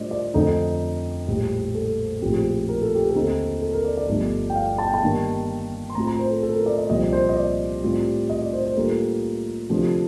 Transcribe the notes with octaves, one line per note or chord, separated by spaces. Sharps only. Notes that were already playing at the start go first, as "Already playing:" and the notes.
Already playing: A2 G3 D4 F4 A#4 C5 D5 D#5
D5
F2 D3 A3 D#4 A4
A#1 A2 G3
A4
A#1 A2 F3 C4 G4
A#4
A4
G4
A4
D#2 D3 A3 C4 D#4
A4
A#4
D5
D5
G1 G2 F3 A3 D#4
G5
F5
A5
G5
A5
G2 D#3 A#3 D4
C6
A2 A3 C4 F4 A#5
A#5
C5
A4
A4
A#4
D5
D#5
C2 A#2 F3 C4 D#5
D5
C5
D#5
D5
A2 G3 C4 F4
D#5
D5
C5
C5
A2 G3 A#3 D4 F4 A4
D2 C3 F3 A3 D4